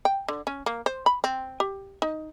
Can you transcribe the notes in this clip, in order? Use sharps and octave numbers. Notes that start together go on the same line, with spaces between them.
G5
D3
C#4
A#3
C5
B5
C4
G4
D#4